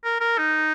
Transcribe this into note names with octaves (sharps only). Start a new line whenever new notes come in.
A#4
A#4
D#4